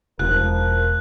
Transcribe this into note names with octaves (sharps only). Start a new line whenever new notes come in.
E1 F3 A#4 F#6